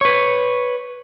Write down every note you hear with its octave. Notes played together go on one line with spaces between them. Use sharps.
B4 C#5